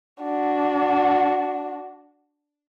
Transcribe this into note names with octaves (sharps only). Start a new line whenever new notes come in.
D4 F#4